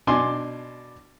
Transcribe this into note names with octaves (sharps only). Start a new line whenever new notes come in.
B2 D4 G#5 C6 D6